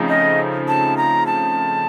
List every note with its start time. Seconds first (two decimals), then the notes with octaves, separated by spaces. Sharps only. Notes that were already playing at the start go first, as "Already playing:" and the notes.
Already playing: C#3 F3 A3 C4 D#4
0.09 D#5
0.68 A5
0.97 A#5
1.27 A5